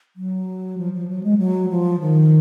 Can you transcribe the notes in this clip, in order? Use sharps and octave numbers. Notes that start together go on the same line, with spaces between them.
F#3
F3
F3
F#3
G#3
F#3
F3
D#3